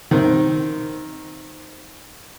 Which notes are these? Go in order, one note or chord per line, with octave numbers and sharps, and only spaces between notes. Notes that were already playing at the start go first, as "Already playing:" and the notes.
D#3 C4